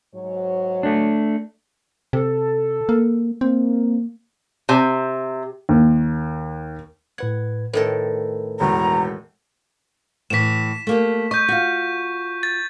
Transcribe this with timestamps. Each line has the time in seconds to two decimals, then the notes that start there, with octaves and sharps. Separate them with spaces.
0.15 G#2 F#3 C#5
0.83 A3 D4
2.13 C3 A4
2.89 A#3
3.41 A#3 C4
4.69 C3
5.69 D#2
7.18 A2 B4 F#5 G#6
7.73 A2 D#3 A4 B4
8.60 E1 E2 A#5
10.30 A2 E3 B6 E7
10.87 A3 A#3 G4
11.31 D#5 C#6 G6
11.48 F4 F#4
12.43 A6